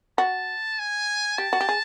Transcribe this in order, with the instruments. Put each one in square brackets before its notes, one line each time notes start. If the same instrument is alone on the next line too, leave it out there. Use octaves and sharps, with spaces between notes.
[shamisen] F#4 [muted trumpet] A5
[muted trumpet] G#5
[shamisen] G4 [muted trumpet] A5
[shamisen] F#4
G4
G#4